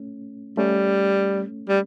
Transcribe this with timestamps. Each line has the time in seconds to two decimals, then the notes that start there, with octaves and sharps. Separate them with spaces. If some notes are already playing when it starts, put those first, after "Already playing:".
Already playing: A3 C#4
0.58 G3 A3 C#4
1.68 G3